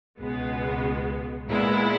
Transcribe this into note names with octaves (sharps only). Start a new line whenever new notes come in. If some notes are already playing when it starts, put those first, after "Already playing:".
C#2 B2 G#3 B3
A#2 G#3 B3 E4